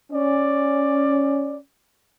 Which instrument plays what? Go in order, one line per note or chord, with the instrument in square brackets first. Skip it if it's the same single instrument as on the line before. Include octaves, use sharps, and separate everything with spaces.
[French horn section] C#4 [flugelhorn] D5